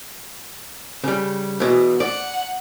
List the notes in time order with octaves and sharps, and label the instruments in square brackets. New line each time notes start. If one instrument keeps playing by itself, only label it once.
[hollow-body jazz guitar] C#3 G3
E2 B2
[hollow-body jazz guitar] D5 [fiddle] F#5